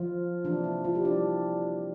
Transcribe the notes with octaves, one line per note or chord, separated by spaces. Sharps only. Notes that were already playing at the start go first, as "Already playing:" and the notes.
Already playing: F3 F4
C3 E3 A#3 D4
E4
F3 F4
G3 G4
D4 D5